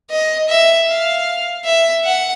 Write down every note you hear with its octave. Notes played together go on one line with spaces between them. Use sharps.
D#5
E5
F5
E5
F#5